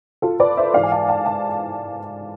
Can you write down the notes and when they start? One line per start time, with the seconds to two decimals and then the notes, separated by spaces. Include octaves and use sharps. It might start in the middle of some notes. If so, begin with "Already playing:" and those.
0.22 F4 A4
0.40 B4 D5
0.57 C5 E5
0.74 G#2 E3 G#3 D5 F5
0.83 G#5
0.92 F5 A5
1.09 F5 A5
1.26 F5 A5